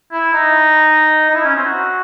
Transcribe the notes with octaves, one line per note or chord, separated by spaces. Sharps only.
E4
D#4
D#4
E4
C#4
C4
F#4